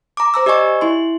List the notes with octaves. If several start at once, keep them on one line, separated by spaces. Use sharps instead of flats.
A#5 D6
C5 A#5 E6
G4 D5 D#5 G#5 C#6
E4 C6